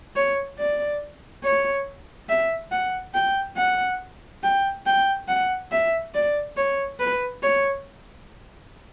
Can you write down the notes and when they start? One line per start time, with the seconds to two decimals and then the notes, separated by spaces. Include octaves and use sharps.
0.16 C#5
0.59 D5
1.44 C#5
2.29 E5
2.71 F#5
3.14 G5
3.57 F#5
4.43 G5
4.86 G5
5.28 F#5
5.72 E5
6.14 D5
6.57 C#5
7.00 B4
7.43 C#5